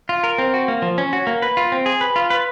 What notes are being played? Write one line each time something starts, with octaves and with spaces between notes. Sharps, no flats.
F4
A#4
C4
F#4
A#3
F3
C#4
F#4
A#3
B4
F4
C4
G#4
B4
F4
B4